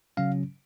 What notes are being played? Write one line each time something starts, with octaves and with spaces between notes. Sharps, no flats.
C#3 F#3 C#4 F5